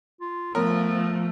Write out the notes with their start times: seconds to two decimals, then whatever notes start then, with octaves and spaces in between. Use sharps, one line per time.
0.21 F4
0.55 F3 A3 B3 A#4